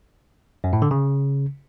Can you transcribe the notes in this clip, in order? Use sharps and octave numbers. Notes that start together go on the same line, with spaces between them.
F#2
A2
D3
C#3